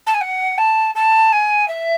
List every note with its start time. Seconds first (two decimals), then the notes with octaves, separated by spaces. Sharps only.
0.07 A5
0.14 G#5
0.21 F#5
0.58 A5
0.95 A5
1.33 G#5
1.68 E5